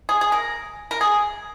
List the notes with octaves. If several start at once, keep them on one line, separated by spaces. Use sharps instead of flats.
G#4
G#4
A#4
A#4
G#4